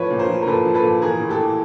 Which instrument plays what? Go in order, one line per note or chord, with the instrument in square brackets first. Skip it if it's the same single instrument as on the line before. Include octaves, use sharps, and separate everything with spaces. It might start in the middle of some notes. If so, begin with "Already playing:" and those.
Already playing: [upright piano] A2 F3 B4 C#5
A#2
A#4 C5
F3
A#4
A#2 A4 B4
F3
A4 B4
A#2
E3 G#4 A#4
A2
G4 A4
E3